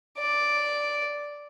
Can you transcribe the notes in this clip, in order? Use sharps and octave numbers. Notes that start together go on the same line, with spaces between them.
D5